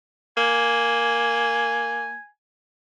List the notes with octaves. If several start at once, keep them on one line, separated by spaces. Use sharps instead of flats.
A#3 G#5